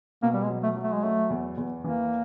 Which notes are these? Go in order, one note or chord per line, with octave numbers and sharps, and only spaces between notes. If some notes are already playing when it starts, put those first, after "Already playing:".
B2 A#3
G3
G#3
F#3
A3
F#3
A3
G#3
F#3 A3
E2
E2
E3 A#3